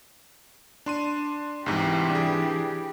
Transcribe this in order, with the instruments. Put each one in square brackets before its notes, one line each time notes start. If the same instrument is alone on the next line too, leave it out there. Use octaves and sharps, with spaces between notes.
[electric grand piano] D4 C6 D#7
[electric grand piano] C2 G#2 C3 [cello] E3 G4
[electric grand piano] D4 G#4